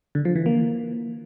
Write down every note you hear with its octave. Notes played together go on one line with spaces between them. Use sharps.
D3
F3
E3
A#3